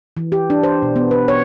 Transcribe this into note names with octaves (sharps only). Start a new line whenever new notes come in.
E3
G4
D4
C5
B2
B3
B4
C#5